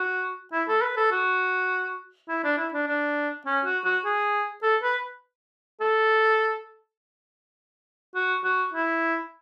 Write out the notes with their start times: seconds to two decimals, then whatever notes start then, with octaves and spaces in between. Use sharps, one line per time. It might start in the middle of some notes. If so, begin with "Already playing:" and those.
Already playing: F#4
0.53 E4
0.68 A4
0.82 B4
0.97 A4
1.12 F#4
2.29 E4
2.44 D4
2.58 E4
2.73 D4
2.87 D4
3.46 C#4
3.65 F#4
3.85 F#4
4.05 G#4
4.63 A4
4.83 B4
5.81 A4
8.15 F#4
8.44 F#4
8.74 E4